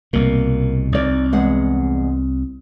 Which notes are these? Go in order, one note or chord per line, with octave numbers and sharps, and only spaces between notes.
C2 B2 A#3
C2 D#4 D5
E2 G#3 F#5